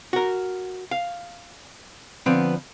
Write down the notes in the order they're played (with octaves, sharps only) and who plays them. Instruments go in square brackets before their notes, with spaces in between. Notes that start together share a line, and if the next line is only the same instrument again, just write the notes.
[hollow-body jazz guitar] F#4 A#4
F5
D3 F3 B3 C4